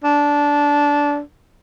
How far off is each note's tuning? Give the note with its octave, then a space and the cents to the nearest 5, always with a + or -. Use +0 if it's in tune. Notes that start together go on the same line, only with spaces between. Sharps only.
D4 -15